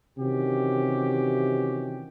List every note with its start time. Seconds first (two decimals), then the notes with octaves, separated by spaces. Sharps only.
0.18 C3 D#3 E3 C#4 F#4 G4